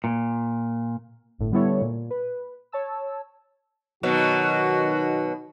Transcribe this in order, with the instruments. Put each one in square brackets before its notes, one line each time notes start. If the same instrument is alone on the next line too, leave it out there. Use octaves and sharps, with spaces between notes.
[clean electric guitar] A#2
[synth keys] G1 A2
D3 G3 B3 E4 A4 C#5
A#2
B4
C#5 A5 E6
[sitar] B2 F#3 [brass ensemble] D#3 D#4 F#4